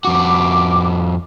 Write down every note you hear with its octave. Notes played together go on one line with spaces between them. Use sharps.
F2 F#4 D6